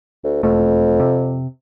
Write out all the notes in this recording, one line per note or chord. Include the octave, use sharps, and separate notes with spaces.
D2
E1 F2 A3
C3